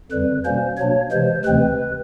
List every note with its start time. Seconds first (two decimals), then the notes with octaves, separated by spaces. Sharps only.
0.12 F2 D3 G3 B4
0.44 B2 G3 A#3 C#4 C5
0.78 B2 F#3 A#3 D4 C#5
1.12 C3 E3 G#3 C5
1.44 D2 C3 E3 G#3 C4 B4